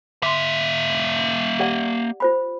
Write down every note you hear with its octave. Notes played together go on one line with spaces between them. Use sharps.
A#3 E5 C6 D6
G4 D5 F#5
F4 C5 B5